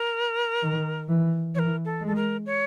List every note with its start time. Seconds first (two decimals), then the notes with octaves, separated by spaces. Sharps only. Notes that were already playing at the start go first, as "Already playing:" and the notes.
Already playing: A#4
0.63 D#3
1.09 E3
1.55 E3 C#5
1.59 A#4
1.85 A4
2.01 G#3
2.07 A4
2.16 A#4
2.46 C#5